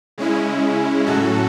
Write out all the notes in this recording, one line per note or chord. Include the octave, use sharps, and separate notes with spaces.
C#3 G#3 C#4 E4
A2 F#3 C#4 F#4 A4